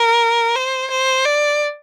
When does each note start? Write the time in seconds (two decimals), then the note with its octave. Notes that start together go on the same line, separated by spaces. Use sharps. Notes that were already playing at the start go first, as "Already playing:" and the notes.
Already playing: A#4
0.56 C5
0.91 C5
1.25 D5